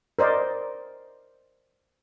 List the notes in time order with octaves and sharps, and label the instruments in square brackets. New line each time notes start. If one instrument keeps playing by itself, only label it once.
[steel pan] A#4 C5 D5 D#5